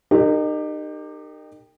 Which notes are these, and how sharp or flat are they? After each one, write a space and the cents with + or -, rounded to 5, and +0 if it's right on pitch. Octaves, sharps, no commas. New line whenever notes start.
D#4 -30 G4 +15 A#4 -30